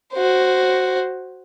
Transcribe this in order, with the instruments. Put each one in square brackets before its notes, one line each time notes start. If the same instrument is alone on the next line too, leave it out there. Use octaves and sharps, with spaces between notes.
[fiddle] F#4 C5